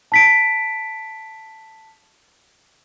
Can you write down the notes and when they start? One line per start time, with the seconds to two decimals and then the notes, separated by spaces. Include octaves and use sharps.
0.12 A5 B6 D7